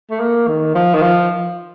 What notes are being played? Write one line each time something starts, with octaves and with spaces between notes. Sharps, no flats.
A3
A#3
D#3
F3
D#3
F3